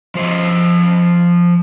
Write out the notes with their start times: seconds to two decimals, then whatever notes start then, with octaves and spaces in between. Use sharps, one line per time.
0.15 F3 C5 D#5